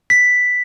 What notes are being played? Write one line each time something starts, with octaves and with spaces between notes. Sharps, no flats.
B6